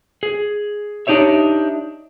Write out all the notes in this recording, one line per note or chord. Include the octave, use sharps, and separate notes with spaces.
G#4
D4 D#4 G4 C#5 E5